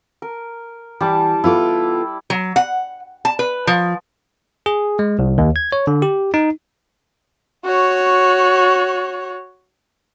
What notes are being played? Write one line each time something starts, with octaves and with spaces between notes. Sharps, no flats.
A#4
E3 G3 A5 D6
B3 E4 F4 A4 D6
F#3
F#5
A5
B4
F3
G#4
G#3
C2
D#2
G#6
C#5
D3
G4
D#4
F#4 C#5